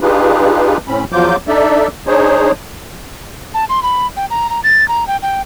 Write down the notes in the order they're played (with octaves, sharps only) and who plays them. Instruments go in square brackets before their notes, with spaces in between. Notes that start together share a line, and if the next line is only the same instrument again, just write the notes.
[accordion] D4 D#4 F4 G4 G#4 B4
A2 C4 C#4 B5
E2 F3 F#3 F4 D6 G6
D4 D#4 A4 D5 E5
D4 D#4 G#4 C5 C#5
[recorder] A5
C6
B5
G5
A#5
A#5
A6
A#5
G5
G5